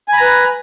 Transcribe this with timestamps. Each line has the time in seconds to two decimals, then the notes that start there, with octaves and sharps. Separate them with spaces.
0.08 G#5
0.13 B5
0.17 A#5
0.21 B4